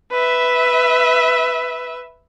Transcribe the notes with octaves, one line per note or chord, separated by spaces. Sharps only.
B4 E5